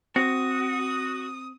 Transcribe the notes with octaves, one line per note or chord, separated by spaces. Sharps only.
C4 F#4 D#6